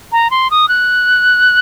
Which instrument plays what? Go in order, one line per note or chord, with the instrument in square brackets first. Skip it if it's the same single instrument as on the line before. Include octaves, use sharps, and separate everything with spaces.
[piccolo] A#5
C6
D#6
F#6